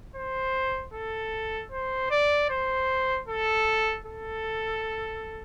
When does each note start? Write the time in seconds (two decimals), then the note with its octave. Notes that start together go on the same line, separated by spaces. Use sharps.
0.16 C5
0.94 A4
1.72 C5
2.11 D5
2.50 C5
3.28 A4
4.07 A4